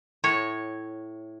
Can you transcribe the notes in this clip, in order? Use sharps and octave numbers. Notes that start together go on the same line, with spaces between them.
A2 C#5